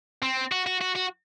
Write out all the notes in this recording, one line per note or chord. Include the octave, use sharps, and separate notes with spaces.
C4
F#4
F#4
F#4
F#4